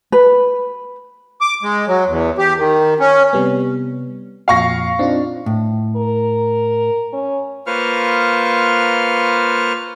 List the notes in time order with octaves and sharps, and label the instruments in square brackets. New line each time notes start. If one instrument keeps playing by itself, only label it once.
[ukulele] B4
[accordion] D6
G#3
F#3
E2
G4
D#3
C#4
[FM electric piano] C3 G3 B3
[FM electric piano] F2 A#2 C7 [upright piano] F5 C#6 A#6
[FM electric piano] C4 D#4 F4 [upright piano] D4
[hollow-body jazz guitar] A2
[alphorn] A#4
C#4
[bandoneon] A#3 F4 B4 C5 C#6 F6